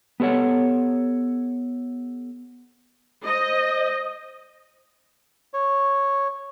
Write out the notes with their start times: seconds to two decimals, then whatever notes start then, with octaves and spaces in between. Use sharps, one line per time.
0.20 B3 G4 A4 C#5 F#5
3.25 C5 D#5
5.54 C#5